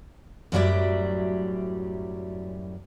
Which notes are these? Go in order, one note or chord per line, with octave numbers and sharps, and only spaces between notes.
F#2 A2 F#3 G3 D5 E5